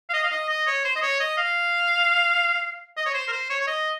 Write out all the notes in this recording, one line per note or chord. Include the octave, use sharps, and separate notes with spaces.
F5
D#5
F5
D#5
D#5
C#5
C5
D#5
C#5
D#5
F5
D#5
C#5
C5
A#4
C5
C#5
C#5
D#5